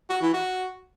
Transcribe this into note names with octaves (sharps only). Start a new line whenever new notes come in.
F#4
E3
F#4